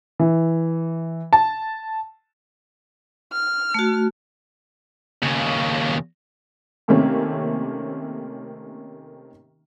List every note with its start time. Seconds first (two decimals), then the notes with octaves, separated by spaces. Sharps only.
0.20 E3
1.33 A5
3.33 F6
3.74 A3 F#4
5.22 D#2 C#3
6.88 C3 D#3 A3 A#3 C4 C#4